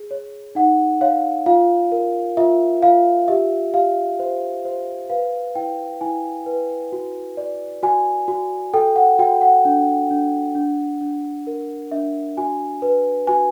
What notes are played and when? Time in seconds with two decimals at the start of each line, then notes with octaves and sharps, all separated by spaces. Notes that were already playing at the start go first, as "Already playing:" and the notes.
Already playing: G#4
0.11 C#5
0.55 D#4 F#5
1.01 C#5 F5
1.46 F4 F5
1.92 A#4
2.37 F4 E5
2.82 F4 F5
3.28 G4 E5
3.74 G4 F5
4.19 C5
4.65 C5
5.10 B4 F5
5.55 E4 G5
6.01 E4 G#5
6.46 B4
6.92 F#4
7.37 D5
7.83 F#4 G#5
8.28 F#4
8.74 A4 G5
8.96 F#5
9.19 F#4 G5
9.41 F#5
9.65 D4
10.11 D4
10.55 D4
11.01 D4
11.47 A#4
11.92 D4 E5
12.37 F#4 G#5
12.82 B4
13.27 F#4 G#5